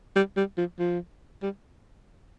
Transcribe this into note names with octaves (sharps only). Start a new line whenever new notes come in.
G3
G3
F3
F3
G3